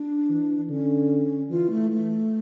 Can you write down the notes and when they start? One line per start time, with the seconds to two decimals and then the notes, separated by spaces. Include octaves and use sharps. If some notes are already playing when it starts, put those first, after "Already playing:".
Already playing: D4
0.29 E3
0.69 D3 C#4
1.50 E3 F4
1.70 A3
1.90 A3